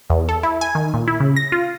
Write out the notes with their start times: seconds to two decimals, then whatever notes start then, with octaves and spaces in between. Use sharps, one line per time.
0.10 E2
0.29 A4
0.43 E4
0.61 G#5
0.75 D#3
0.94 A#2
1.08 E4
1.20 C#3
1.36 A#6
1.52 F4